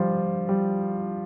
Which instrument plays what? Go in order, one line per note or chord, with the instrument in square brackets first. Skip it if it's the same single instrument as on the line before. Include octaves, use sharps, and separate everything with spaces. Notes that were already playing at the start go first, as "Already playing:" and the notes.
Already playing: [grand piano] F3 G3
G3